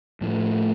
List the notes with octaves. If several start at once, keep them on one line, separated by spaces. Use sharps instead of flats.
A2 F3 A3